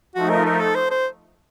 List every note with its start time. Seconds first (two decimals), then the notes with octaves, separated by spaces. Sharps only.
0.15 F3 A3 D#4 F#4
0.30 A#4
0.46 A#4
0.60 A4
0.75 C5
0.91 C5